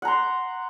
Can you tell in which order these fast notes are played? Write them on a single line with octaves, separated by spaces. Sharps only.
F#5 A#5 C6